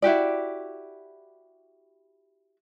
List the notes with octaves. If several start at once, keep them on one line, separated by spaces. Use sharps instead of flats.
E4 F#4 G4 D5